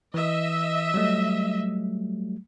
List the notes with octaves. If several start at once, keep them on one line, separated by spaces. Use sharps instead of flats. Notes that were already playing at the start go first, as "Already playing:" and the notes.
E3 D#5 E5
F#3 G3 A3